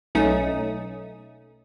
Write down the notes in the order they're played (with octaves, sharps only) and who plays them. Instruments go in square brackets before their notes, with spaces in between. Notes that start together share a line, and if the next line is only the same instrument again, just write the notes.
[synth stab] B1 A3 C#4 D#4 D#6